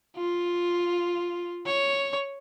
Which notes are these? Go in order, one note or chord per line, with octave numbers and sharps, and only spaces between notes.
F4
C#5